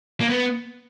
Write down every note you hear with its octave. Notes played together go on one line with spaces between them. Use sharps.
A#3
B3